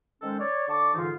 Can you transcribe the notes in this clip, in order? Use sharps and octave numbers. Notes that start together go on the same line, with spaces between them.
D#3 G#3 C#4 A4 C5
C#5 D5
D3 A5 C#6 D6
G#2 D3 E3 D#4 F4